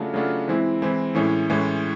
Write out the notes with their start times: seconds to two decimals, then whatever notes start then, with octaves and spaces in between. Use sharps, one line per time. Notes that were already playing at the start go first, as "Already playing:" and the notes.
Already playing: C#3 F#3 A3 D4 F4
0.14 C#3 F#3 A3 D4 F4
0.48 E3 G#3 C4 E4
0.82 E3 G#3 C4 E4
1.15 A2 E3 G#3 C#4
1.49 A2 E3 G#3 C#4